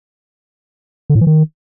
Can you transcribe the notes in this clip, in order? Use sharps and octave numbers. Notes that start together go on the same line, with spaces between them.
D3
A2
E3
D#3